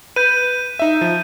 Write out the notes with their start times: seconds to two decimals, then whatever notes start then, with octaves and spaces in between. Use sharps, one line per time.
0.16 B4 G6 D#7
0.79 D#4 E5
1.01 F3